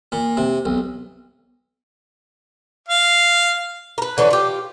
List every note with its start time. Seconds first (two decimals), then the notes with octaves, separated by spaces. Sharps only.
0.12 A#2
0.37 C3
0.65 B1
2.88 F5
3.98 A#4 B4
4.18 D3 E3 C#4 B4
4.31 F4 G4